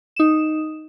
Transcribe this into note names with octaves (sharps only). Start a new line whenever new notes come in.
D#4 E7